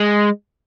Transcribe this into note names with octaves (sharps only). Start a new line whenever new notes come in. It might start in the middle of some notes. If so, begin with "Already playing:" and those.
Already playing: G#3